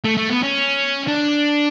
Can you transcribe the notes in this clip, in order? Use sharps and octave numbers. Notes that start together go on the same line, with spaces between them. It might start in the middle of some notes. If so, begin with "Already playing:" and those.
A3
A3
B3
C#4
D4